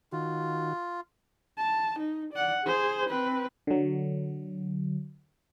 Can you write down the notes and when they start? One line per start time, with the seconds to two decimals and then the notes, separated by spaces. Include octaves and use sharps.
0.12 D#3 F4 F#4
1.58 A5
2.00 D#4
2.34 D5 F#5
2.64 G#4 C5
3.10 C4 B4
3.67 D3 F#3